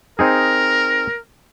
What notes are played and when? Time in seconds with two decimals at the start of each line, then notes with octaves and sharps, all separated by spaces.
0.19 C4 D#4 G#4 A#4